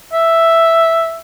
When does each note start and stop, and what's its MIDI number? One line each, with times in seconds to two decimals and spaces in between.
0.13 1.19 76